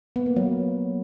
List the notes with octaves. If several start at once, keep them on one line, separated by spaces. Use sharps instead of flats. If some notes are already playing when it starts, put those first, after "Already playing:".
B3
A#3
F#3